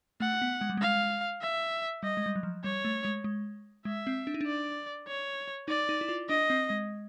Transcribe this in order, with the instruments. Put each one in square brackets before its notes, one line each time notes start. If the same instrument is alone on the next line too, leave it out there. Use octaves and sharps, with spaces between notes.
[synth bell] A3 [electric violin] F#5
[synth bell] B3
G#3
G3
[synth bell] G#3 [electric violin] F5
[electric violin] E5
[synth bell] G3 [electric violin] D#5
[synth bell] G#3
G3
F#3
F3
[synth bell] G3 [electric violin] C#5
[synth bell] A3
G#3
G#3
[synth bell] G#3 [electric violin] E5
[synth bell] C4
D4
D#4
D4
[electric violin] D5
C#5
[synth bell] D#4 [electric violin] D5
[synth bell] D#4
E4
F4
[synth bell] D4 [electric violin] D#5
[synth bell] C4
G#3